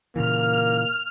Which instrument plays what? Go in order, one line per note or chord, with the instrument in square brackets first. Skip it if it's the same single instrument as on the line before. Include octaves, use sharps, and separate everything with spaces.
[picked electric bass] A#2 C#3 E3 [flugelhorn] A#3 [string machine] F6